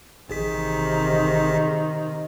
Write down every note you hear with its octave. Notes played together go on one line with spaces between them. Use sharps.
A1 C3 D#3 G#4 B6